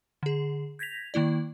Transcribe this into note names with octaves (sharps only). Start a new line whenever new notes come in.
D3 G#4
G6 G#6 A#6 B6 F7
D#3 A#3 E4 D5